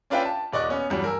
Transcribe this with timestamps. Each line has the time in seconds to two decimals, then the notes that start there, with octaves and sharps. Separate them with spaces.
0.10 C#4 D4 F4 B4 E5 G5
0.25 A5
0.52 D#1 D5 D#5 C#6 F#6
0.69 B3 C#4
0.90 E2 G2 F#3
1.04 A#4 G#5 E6